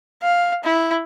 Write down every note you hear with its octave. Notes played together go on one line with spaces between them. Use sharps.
F5
E4